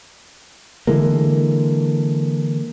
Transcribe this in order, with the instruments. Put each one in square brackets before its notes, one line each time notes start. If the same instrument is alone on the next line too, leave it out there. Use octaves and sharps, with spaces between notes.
[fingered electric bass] D3 E3 G#3 A#3